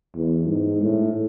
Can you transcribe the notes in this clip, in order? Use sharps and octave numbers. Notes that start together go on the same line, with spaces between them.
E2
G#2
A2